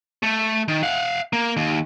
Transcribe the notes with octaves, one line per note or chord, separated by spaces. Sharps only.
A3
D#3
F5 F#5
A#3
D#2